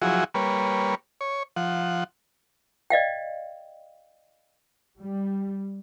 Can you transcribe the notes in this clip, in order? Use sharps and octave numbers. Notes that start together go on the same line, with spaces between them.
F3 F#3 E4 F#4 G#4
G3 A#3 B4 C#5
C#5
F3 F#5
D5 D#5 F5 G5
G3